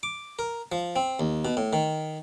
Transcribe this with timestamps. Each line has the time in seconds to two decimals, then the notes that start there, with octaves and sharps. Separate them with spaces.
0.03 D6
0.39 A#4
0.72 F3
0.96 C4
1.20 D#2
1.45 B2
1.57 A2
1.73 D#3